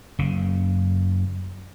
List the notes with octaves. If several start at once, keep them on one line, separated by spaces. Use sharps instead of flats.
F#1 C#3